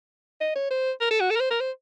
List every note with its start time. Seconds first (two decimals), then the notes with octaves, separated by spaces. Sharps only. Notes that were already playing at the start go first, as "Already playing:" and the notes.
0.41 D#5
0.56 C#5
0.70 C5
1.01 A#4
1.11 A4
1.20 F#4
1.30 A4
1.36 A#4
1.40 C5
1.50 A#4
1.60 C5